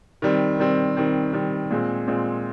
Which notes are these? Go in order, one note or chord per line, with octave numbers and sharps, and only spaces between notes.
D#3 G3 C4
D#3 G3 C4
D#3 G3 C4
D#3 G3 C4
A#2 G#3 C4
A#2 G#3 C4